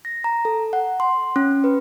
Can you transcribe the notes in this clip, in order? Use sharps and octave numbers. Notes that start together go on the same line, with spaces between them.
A#6
A#5
A4
F#5
C6
C#4
B4